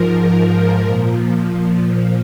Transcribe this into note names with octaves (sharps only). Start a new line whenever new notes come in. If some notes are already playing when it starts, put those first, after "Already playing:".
Already playing: G#2 F3 A#4
A#2 F3